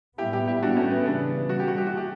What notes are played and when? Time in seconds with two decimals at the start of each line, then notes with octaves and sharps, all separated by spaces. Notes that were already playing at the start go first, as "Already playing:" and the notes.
0.18 A2 G3 B3 E4 G4
0.33 E4 G4
0.47 E4 G4
0.63 D4 F#4
0.76 A3 C#4
0.91 B3
1.06 C#3 E3 G3 B3 D4
1.49 F#4
1.59 G4
1.68 F#4
1.78 G4
1.87 F#4
1.97 G4